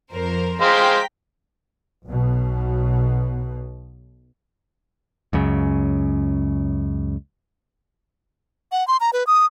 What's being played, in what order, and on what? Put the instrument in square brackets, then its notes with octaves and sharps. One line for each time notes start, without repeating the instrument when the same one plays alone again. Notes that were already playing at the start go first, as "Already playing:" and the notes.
[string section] F2 A#4 C5
[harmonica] G#3 C5 F5 [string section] G5 A#5 B6
[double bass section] B1 B2
[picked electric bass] C#2 F#2 C#3
[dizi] F#5
C6
A#5
B4
D#6